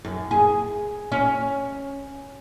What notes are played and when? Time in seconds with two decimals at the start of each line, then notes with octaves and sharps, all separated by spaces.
0.05 F#2
0.31 G#4
1.12 C#4